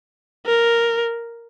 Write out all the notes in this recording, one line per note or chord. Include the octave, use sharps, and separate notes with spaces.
A#4